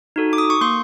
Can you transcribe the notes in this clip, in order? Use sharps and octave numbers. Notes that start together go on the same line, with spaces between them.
D#4 F#4 A4
D6
D#6
C#6
A#3 C6